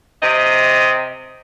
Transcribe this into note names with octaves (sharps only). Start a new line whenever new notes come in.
C3 D#5